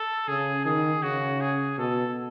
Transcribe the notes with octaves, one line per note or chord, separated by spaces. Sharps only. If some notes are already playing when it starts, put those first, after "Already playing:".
Already playing: A4
C#3 G#4
D#3 G#4
C#3 F#4
G#4
B2 A4